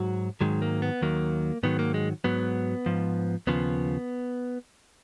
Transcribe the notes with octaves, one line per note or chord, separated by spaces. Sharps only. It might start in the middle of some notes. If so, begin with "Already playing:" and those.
Already playing: G#2 F#3 F#4
G#2 D#3 F#3 G#3
A#3
B3
D#2 D#3 F#3 A#3
G#2 D#3 F#3 B3
A#3
G#3
G#2 F#3 B3
G#2 F3
D#2 C#3 F3 B3